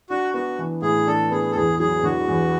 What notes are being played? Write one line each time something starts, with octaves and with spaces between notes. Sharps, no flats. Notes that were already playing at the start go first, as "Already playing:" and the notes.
D4 F#4
B3 F#4
E3
A2 G#4
D4 A4
B3 G#4
A4
E2 G#4
F#3 G#4
D3 F#4
E2